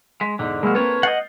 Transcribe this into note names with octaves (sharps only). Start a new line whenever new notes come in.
G#3 B6
E2 G#2 D3
C2 F#3 G#3 A#3 B5 E6 F6
A#3 C4 A4 B4 C#5
D#5 F#5 G6 A6 C7